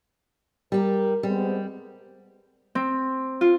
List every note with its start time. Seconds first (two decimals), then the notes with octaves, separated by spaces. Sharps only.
0.72 G3 G4 A#4
1.23 G3 G#3 B3 C4
2.75 C4
3.41 F4